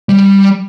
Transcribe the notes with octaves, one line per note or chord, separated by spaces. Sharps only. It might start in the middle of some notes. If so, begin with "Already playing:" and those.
G3